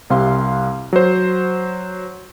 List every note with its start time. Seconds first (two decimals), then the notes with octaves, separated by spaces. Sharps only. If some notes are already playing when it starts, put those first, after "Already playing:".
0.10 C2 C3 F5 C6
0.93 F#3 C5